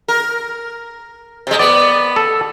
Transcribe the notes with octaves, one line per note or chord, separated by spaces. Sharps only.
A#4
C3 G#3
B3 D5
A4